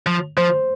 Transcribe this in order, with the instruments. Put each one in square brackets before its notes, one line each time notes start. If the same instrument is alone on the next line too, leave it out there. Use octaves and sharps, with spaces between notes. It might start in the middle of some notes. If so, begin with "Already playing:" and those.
[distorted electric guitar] F3
[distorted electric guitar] F3 [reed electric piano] C5